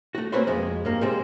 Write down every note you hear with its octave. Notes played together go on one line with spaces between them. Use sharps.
A3 F#4
A#3 C4 C#4 F#4 B4 C5
F2 G#3
G2 A#3
G3 G#3 C4